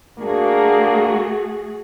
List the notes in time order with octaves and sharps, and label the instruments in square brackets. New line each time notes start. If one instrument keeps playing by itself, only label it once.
[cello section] A3 F#4 G#4 [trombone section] A#3 D4